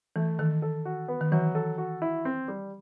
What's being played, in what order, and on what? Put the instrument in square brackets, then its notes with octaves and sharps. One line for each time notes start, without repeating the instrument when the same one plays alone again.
[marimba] E3 [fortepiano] A3
[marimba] D#3 [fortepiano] A4
[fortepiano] A4
F#4
B3
[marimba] D#3
[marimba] E3 [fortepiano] F#3
[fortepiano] A4
F#4
E4
C4
G3